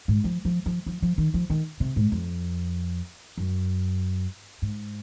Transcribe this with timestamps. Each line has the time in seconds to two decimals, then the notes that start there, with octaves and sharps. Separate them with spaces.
0.08 G#2
0.24 F3
0.45 F3
0.66 F3
0.86 F3
1.02 F3
1.18 D#3
1.34 F3
1.50 D#3
1.80 C3
1.96 G#2
2.12 F2
3.37 F#2
4.62 G#2